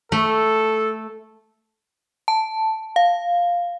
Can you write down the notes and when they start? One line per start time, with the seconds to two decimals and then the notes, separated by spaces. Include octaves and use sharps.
0.12 A3 A4
2.28 A5
2.96 F5